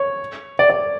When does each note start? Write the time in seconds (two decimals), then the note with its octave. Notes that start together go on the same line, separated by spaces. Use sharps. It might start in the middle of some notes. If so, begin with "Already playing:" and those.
Already playing: C#5
0.59 D5
0.70 D5